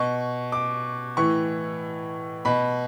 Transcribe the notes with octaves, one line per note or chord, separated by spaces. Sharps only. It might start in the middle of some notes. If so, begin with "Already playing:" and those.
Already playing: B2 C#6
D6
A2 E3 C#6
B2 B5